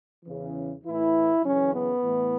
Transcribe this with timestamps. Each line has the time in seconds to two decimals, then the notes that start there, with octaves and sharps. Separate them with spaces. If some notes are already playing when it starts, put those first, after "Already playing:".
0.25 E2 C#3 E3
0.84 A2 E3 E4
1.43 F#2 C#3 E3 C#4
1.72 B3
2.02 A2 E3